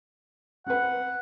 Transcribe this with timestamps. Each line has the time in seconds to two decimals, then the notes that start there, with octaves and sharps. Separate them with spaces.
0.67 C4 B4 F#5